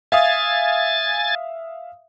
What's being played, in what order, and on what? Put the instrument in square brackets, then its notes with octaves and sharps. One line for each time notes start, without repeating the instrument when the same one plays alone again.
[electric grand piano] E5 F5 D#6 [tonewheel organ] G#5 A6